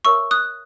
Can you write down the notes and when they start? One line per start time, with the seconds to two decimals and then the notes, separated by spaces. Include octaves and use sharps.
0.05 A#4 C#5 E5 C#6 E6
0.31 D#6 F#6